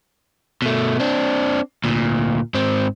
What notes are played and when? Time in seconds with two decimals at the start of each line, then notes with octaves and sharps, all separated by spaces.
0.62 B2 A3
1.00 C4 D4
1.84 D2 A#2
2.54 G#2 C4